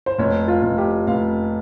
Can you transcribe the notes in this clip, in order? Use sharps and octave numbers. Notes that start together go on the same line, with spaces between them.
C5
F1 C#5
F4
F1
G4
F1 F5